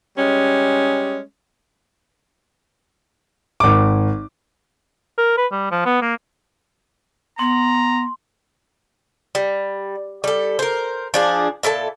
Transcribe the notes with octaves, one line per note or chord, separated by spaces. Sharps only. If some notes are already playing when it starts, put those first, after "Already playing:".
G3 G#3 C#4
G#1 D6
A#4
B4
G3
F3
B3
A#3
B3 A#5 C6
G3
G3 A4
A#4 C5
F3 D4 G#4
A#2 E4 A4 A5